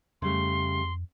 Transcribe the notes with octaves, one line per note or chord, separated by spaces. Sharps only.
F2 C#3 G3 A3 C6